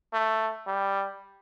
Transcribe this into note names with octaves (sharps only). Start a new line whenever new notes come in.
A3
G3